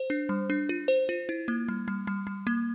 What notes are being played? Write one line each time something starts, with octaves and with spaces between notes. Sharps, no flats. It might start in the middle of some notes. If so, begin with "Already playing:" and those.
Already playing: C5
D4
G3
D4
F4
C5
F4
E4
A#3
G3
G3
G3
G3
A#3